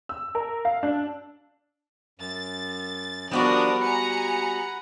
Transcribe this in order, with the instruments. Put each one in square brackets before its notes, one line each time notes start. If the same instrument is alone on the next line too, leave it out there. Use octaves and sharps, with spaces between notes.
[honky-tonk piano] E6
A#4
F5
D4
[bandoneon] F#2 [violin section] A6
[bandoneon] F3 D4 D#6 [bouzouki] G3 B3 F#4 [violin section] A#4 D5
[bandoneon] F#5 B5 [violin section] G#5 A#5 C#7